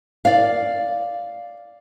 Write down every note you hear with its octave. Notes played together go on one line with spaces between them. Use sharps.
D5 F5